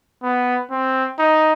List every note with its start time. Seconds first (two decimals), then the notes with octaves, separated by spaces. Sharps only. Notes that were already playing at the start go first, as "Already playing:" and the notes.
0.23 B3
0.71 C4
1.19 D#4